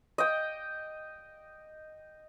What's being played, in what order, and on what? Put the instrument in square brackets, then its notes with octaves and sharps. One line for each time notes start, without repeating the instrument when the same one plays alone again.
[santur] D#5 G5